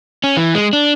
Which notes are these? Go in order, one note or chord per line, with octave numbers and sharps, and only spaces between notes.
C#4
E3
G#3
D4